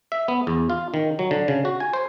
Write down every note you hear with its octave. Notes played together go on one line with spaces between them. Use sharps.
E5
B3
E2
F4
D#3
F#3
D3
C#3
F#4
G#5
C5